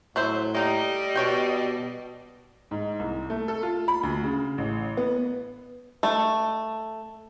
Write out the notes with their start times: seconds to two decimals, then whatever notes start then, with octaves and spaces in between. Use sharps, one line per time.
0.16 A2 F#3 E4 C5
0.55 G3 A#3 D#4 D#5
1.16 B2 D4 C#5 G5
2.71 G#2
2.99 C2
3.30 A3
3.48 A4
3.63 F4
3.88 B5
4.03 D2
4.23 C#3
4.58 A1
4.97 B3
6.03 A3